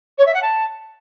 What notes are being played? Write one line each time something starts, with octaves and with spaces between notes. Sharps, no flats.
C#5
E5
F#5
A5